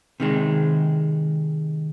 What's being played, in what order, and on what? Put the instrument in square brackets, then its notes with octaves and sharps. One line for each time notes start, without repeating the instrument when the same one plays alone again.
[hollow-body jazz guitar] C3 D#3 G#3